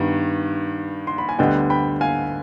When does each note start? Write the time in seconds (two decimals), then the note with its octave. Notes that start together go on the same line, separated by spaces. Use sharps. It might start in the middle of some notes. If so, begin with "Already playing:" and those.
Already playing: G2 D#3 B3
1.07 C6
1.18 B5
1.29 G#5
1.39 D2 D3 G3 B3 D#5 G5
1.70 G5 B5
2.01 F5 G#5